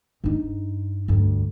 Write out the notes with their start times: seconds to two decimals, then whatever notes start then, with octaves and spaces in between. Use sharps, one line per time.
0.24 G2 D#4
1.08 D2 G2